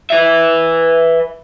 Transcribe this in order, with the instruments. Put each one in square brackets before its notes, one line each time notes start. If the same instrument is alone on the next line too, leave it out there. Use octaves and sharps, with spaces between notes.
[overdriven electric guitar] B4 E5